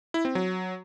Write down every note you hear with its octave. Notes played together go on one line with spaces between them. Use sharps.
E4
C4
F#3